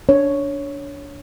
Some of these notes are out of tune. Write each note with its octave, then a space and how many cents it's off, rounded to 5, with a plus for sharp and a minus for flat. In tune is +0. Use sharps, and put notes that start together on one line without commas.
D4 -20 C#5 +0